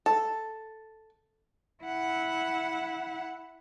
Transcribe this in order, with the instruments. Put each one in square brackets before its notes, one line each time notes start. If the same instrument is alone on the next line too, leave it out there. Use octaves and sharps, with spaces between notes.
[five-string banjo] A4
[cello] E4 F#5